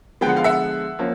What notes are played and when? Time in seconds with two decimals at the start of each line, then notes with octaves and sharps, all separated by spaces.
0.21 D3 F3 G#3 B3 G5
0.29 F#5
0.36 F5
0.44 E5 F#5
0.99 F3 A#3 C#4